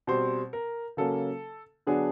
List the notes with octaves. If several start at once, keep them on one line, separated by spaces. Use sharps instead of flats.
B2 G3 C4 C5
A#4
C#3 F#3 A#3 C#4 A4
D3 F#3 B3 D4 G#4